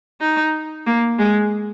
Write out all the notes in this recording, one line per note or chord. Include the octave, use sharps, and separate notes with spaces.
D#4
A#3
G#3